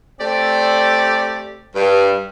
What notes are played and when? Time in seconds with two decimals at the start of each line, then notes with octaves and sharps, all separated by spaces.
0.20 A3 C4 G4 D5
1.75 G2